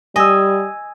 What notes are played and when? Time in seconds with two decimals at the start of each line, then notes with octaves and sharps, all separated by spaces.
0.16 G3 D#5 G#5 E6